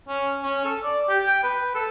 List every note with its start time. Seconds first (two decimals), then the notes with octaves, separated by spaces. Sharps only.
0.08 C#4
0.43 C#4
0.65 A4
0.84 D5
1.09 G4
1.25 G5
1.43 B4
1.75 A4